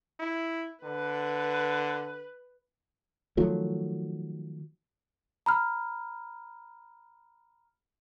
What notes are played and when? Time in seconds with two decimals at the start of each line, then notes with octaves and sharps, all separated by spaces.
0.19 E4
0.84 D3 B4
3.37 D#3 F3 F#3 A3
5.46 A#5 B5 F6